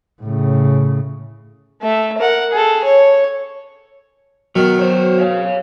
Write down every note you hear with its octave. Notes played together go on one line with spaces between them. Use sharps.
A2 C#3
A3 E5
A#4 F#5
G#4 A4
C#5
B2 D#3 F#3
C5 C#5
C#5 F5